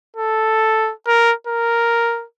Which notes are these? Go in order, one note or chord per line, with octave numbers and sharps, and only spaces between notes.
A4
A#4
A#4